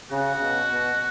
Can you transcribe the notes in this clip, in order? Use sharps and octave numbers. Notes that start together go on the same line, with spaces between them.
C#3 F#4
B2
B2